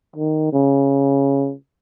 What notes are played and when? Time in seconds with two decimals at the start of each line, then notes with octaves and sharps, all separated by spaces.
0.16 D#3
0.53 C#3